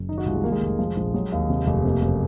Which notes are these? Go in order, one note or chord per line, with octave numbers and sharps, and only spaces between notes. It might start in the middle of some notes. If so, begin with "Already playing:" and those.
Already playing: F#1
D#3 D#4
F#4
C2 F4
G#3
D#3 A#3
G#3
F1
F3
A#1
F#3 G#3
D#2
C3
F1
C3 A#3
F#1